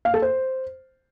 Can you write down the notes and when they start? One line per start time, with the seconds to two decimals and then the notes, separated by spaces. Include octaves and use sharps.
0.05 F5
0.14 A4
0.22 C5